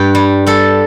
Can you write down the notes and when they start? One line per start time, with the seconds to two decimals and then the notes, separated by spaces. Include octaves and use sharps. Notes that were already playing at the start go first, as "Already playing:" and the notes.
Already playing: G2 G4
0.15 G3
0.47 G3 A4